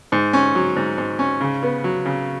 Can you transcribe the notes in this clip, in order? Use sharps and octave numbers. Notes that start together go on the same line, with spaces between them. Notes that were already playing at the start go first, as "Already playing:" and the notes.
G#2
C#4
F#3
G#2
G#2
C#4
C#3
B3
F#3
C#3